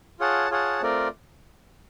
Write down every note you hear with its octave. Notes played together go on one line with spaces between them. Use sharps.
F4 G#4 C#5 F#5 A5
F4 G#4 C#5 F#5 A5
A3 C4 F4 A#4 D5